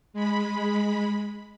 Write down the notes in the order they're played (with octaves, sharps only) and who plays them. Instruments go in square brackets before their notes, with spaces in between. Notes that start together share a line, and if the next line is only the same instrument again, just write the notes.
[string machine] G#3 B5